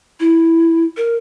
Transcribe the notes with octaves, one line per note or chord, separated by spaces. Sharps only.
E4
A#4